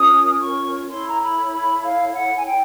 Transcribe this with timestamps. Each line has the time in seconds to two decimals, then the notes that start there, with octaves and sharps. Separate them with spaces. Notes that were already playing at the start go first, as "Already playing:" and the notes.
Already playing: C#4 F4 A#4 C#5 D#6
0.41 C#6
0.88 E4 A4 C#5 C6
1.08 A#5
1.20 B5
1.51 B5
1.83 F5
2.14 F#5
2.37 G#5
2.46 G5